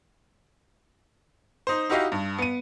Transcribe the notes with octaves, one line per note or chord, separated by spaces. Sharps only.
D#4 C5
D#4 E4 F#4 G4 D#5 F5
G2
B3 D#7